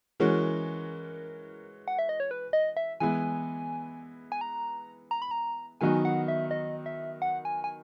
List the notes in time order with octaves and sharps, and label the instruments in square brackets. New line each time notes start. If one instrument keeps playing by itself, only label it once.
[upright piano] E3 G#3 C#4 F#4 [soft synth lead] A#4
[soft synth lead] F#5
E5
D#5
C#5
B4
D#5
E5
[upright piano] E3 G#3 B3 E4 [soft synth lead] G#5
[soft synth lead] G#5
A#5
A#5
B5
A#5
[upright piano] D#3 F#3 B3 D#4 F#4 [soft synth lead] G#5
[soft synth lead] F#5
E5
D#5
E5
F#5
G#5
G#5